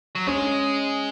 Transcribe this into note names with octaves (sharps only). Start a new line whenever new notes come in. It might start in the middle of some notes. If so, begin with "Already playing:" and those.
F#3
G#3 C#4